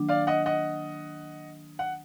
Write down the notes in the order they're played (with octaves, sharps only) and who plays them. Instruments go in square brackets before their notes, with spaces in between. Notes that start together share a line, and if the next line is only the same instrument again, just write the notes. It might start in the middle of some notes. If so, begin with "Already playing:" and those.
Already playing: [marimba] D#3 F#3 A#3 D4
[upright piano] D5 F5
D#5 F#5
D#5 F#5
F#5